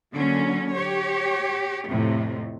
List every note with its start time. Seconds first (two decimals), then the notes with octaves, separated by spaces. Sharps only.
0.14 D3 F#3 A#3 C#4
0.72 G4 C#5
1.89 F2 A2 C3